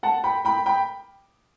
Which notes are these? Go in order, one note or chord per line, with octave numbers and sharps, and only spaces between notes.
F#5 A5
G5 B5
G5 B5
G5 B5